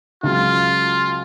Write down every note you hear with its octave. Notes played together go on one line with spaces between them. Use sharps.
C#2 F#3 F4